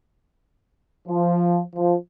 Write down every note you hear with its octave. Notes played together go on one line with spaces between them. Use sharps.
F3
F3